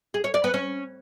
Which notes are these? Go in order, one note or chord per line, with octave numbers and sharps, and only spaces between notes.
G#4
C#5
D5
B3
C#4